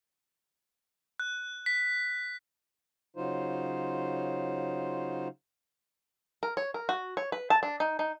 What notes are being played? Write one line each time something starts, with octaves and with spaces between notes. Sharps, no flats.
F#6
B6
C#3 F#3 D#4 F4 C5
A#4
C#5
A#4
F#4
C#5
B4
A5
D4
D#4
D#4